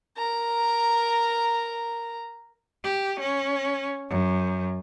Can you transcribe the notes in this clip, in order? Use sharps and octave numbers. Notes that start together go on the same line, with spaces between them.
A#4 A#5
G4
C#4
F#2